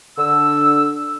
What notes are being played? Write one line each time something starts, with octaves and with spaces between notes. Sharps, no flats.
D3 E6